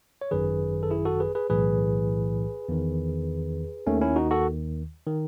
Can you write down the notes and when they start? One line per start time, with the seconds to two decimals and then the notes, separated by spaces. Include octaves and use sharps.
0.21 C#5
0.31 G#1 F#2 D#3 G#4 B4
0.83 A4
0.90 E4 G#4
1.05 F#4 A4
1.20 G#4 B4
1.35 G#4 B4
1.50 B1 A2 E3 G#4 B4
2.69 E2 D#3
3.87 D#2 D#3 A3 C#4
4.01 C#4 E4
4.16 D#4 F#4
4.31 F#4 A4
5.07 D#3